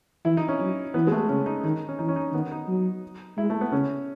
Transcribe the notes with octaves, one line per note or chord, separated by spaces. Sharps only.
E3 E4
D#4
C#4
F#3
E3 B3
G#3
A3
C#3 C#4
D#4
D#3 D#4
C#4
E3 D#4
C#4
D#4
D#3 B3
D#4
F#3
G#3 E4
A3
B3
C#3 C#4